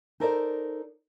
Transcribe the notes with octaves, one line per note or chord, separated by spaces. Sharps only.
D#4 A4 A#4 C5 D5